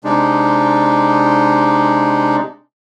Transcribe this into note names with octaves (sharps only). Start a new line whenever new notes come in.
C3 G#3 D4 D#4